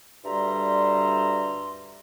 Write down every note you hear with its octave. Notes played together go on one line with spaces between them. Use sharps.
D2 G2 G3 E5 A#5 C6